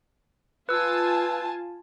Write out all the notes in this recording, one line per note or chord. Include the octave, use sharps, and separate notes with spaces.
F4 B4 G#5 A5 E6